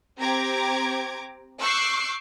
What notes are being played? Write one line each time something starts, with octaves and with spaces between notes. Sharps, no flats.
C4 G4 A#5 D6 G#6
C#6 D6 E6 F#6 G6 C7